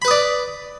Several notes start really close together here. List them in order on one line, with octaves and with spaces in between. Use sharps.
B5 B4 D#6 D5